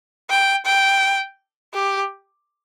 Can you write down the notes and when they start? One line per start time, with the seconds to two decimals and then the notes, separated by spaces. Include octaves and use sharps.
0.30 G5
0.66 G5
1.74 G4